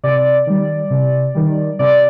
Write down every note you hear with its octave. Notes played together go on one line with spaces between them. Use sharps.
C3 D5
D#3 G3
C3
D#3 G3
C3 D5